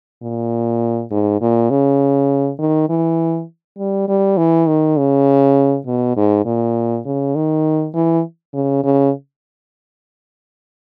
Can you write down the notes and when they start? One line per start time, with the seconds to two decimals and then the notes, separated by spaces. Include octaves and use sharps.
0.22 A#2
1.11 G#2
1.41 A#2
1.70 C#3
2.59 D#3
2.89 E3
3.78 G3
4.08 G3
4.37 E3
4.67 D#3
4.97 C#3
5.87 B2
6.16 G#2
6.45 A#2
7.05 C#3
7.35 D#3
7.94 E3
8.53 C#3
8.84 C#3